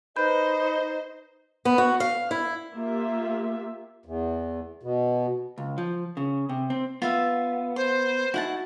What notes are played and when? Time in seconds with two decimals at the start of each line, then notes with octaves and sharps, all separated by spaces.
0.16 D#4 B4 C5 D#5 B5 G6
1.65 B3
1.78 F#4
2.00 F5
2.31 E4
2.74 A#3 F4 G4 E5
4.06 E2
4.83 B2
5.58 C#2
5.78 F3
6.17 C#3
6.49 C3
6.70 C4
7.02 B3 F4 E5 F5
7.76 C5 C6
8.34 D#4 E4 F#4 F#5 A5